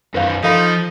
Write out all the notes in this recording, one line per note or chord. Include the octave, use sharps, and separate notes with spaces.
F#2 D#3 B4 C5 F5
F3 D#4 A4 F5 B5